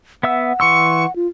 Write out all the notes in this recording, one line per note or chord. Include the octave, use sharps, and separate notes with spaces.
B3 E5 F#5 E6
E3 C6 C#6 E6
F4